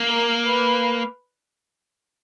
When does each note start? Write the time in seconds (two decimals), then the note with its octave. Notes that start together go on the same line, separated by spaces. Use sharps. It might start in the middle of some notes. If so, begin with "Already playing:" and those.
Already playing: A#3
0.10 A#4
0.46 B4